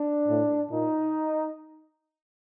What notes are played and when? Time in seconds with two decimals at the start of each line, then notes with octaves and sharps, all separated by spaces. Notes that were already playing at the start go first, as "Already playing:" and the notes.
Already playing: D4
0.28 A2
0.70 A#2 D#4